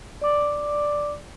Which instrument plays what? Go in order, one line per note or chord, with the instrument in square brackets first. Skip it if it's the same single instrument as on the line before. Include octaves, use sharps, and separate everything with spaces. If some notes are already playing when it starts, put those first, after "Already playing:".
[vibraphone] D5 D6